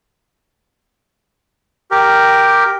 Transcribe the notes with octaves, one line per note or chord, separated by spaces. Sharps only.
G4 A#4